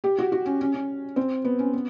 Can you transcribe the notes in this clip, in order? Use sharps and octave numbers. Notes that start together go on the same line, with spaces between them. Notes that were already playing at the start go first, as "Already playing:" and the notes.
G4
F#4
F#4
C#4
C#4
C#4
C4
B3
C#4
B3